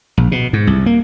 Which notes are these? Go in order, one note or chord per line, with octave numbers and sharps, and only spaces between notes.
A#1
B2
G#2
C2
A#3